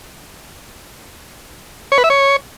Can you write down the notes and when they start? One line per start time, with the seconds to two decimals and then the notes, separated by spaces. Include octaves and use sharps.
1.92 C#5
1.98 B4
2.04 E5
2.10 C#5